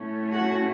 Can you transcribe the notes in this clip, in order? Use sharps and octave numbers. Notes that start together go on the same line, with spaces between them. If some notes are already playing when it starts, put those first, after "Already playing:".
Already playing: A2 A3 C#4
F#4